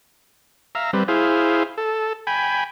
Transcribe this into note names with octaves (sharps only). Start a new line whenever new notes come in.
E5 F5 A#5
G3 C4 B4
E4 G#4 C5 F5
A4
G5 G#5 B5